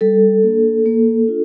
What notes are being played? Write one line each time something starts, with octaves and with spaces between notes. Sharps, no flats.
G3 A4
A#3 D4
A#3
D4 F4